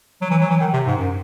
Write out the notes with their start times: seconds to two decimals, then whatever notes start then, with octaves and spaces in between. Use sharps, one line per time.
0.22 F#3
0.31 E3
0.41 F#3
0.50 E3
0.61 D#3
0.74 C3
0.86 G#2
0.98 F#2